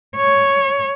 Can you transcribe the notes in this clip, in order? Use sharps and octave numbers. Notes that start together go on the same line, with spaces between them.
C#5